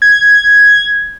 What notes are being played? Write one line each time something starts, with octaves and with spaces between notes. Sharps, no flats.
G#6